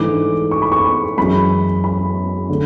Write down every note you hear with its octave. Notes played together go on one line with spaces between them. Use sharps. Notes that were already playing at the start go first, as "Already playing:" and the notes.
Already playing: G#2 E3 A3 D4 D6
C#6
B5
C#6
F#2 E3 G#3 B5
B5
D3 A3